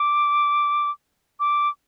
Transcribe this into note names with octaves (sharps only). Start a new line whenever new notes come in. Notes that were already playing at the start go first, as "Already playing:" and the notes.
Already playing: D6
D6